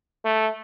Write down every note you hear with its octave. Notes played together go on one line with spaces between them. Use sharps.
A3